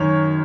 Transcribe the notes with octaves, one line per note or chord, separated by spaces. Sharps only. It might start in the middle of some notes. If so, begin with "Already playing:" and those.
Already playing: F#2 D#3 C#5